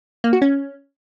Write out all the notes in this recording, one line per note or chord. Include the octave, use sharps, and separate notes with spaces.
A#3
F#4
C#4